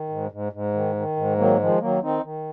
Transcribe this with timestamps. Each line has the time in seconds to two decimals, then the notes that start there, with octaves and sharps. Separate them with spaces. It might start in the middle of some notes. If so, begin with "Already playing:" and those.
Already playing: D#3
0.09 G#2
0.31 G#2
0.52 G#2
0.73 D#3
0.96 D#3
1.16 G#2
1.38 D#3 F#3 A#3
1.59 D#3 F3 G#3
1.80 D#3 F#3 A#3
2.02 D#3 C4 D#4
2.23 D#3